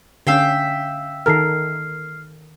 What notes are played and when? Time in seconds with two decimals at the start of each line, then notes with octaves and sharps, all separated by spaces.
0.27 D3 C#4 E5 F5 G5
1.26 D#3 A4 A#4 F6 C7